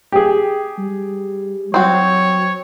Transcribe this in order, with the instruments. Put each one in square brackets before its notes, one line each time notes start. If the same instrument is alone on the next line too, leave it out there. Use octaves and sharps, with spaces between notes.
[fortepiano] G4 G#4
[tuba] G3
[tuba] F#3 [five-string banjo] C4 F#4 [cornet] C#5